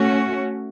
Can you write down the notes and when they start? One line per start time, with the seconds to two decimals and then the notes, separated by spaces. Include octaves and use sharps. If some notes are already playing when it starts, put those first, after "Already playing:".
Already playing: A3 C#4 F#4